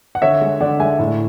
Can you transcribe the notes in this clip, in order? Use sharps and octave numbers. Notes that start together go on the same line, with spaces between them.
F#5
D3 C#5 E5
G#3
D3 D5 F#5
G#3 E5 G#5
A2